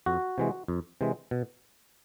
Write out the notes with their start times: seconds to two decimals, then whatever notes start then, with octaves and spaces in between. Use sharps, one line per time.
0.06 F2 F#4
0.38 C3 E3 G#3
0.68 F2
1.01 C3 E3 G#3
1.31 B2